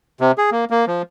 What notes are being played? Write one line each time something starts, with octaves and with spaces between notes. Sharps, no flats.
C3
G#4
A#3
A#3
F3